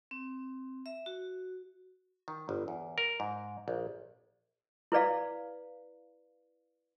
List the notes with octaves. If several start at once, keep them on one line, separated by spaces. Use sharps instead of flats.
C4
E5
F#4
D#3
G1
E2
A#4
G#2
A#1
E4 B4 D5 F5